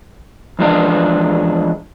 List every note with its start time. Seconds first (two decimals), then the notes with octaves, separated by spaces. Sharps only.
0.59 E2 F3 G#3 D4